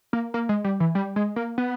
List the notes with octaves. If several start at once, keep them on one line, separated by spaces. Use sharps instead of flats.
A#3
A#3
G#3
G3
E3
G3
G#3
A#3
B3